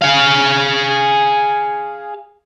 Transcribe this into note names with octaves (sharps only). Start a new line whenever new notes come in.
G#4 F5